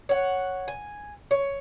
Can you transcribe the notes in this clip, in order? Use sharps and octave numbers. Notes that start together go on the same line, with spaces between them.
C#5 F#5
G#5
C#5